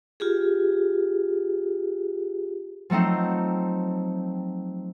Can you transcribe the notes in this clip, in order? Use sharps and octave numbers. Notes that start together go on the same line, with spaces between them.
F4 G4 G#4
F3 F#3 A3 C4 D#4